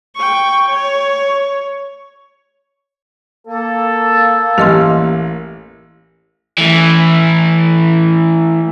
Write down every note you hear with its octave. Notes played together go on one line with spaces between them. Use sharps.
G5 C#6
C#5
A#3 A4
A1 G4 D#5 C6
E3 A3